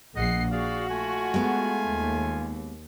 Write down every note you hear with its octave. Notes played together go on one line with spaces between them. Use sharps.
A#1 D#5 F#5 C7
F#4 G#4 D5 F5
A3 F4 G#5
G#3 B3
D#2